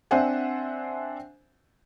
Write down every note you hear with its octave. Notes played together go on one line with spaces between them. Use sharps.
C4 D4 C5 E5 F#5 G#5